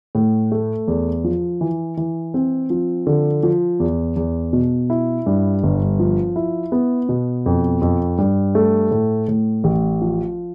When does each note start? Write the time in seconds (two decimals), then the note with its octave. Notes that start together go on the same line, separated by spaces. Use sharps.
0.15 A2
0.52 A3
0.88 E2
1.24 F3
1.61 E3
1.97 E3
2.34 C4
2.70 F3
3.07 D3
3.43 F3
3.80 E2
4.16 E2
4.53 B2
4.90 E4
5.26 G2
5.63 G1
5.99 F3
6.36 E4
6.72 B3
7.09 B2
7.46 F2
7.82 F2
8.18 G2
8.55 A3
8.91 A2
9.28 A2
9.64 A1
10.02 F3